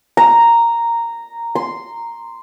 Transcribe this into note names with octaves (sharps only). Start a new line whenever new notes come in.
A#5
C6